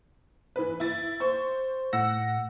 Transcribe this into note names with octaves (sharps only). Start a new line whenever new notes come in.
E3 B4
E4 A6
C5 C#6
A2 F#5 E6 A#6